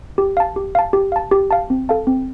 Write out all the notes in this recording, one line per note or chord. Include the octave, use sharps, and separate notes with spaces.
G4
F5 A5
G4
F5 A5
G4
F5 A5
G4
F5 A5
C4
A4 F5 A5
C4